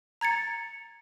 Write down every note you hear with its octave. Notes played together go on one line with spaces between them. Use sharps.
A#5 G#6 A6 C#7